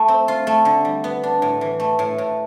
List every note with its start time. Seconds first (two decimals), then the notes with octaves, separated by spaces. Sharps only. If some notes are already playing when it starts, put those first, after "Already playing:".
Already playing: A3
0.08 C4
0.28 F4
0.47 A3
0.65 D3
0.85 G3
1.04 B3
1.23 D4
1.42 A2
1.61 E3
1.80 A3
1.99 A2
2.18 A2